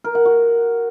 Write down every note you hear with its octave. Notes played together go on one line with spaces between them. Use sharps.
A#4
F#5
F#4